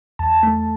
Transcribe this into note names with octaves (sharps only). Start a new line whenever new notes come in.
E2 A5
A3